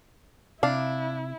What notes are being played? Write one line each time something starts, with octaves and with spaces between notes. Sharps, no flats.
C3 D4 E4 F5